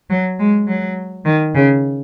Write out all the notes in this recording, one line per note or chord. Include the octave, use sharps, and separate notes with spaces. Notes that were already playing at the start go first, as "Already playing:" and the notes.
F#3
G#3
F#3
D#3
C#3